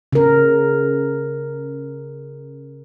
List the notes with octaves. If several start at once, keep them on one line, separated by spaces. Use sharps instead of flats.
C#3 A#4